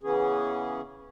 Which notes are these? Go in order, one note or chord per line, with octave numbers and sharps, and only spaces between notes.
C#3 E3 B3 C#4 G#4